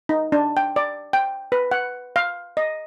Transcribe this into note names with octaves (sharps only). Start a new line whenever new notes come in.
D#4
D4
G5
D5
G5
B4
F#5
F5
D#5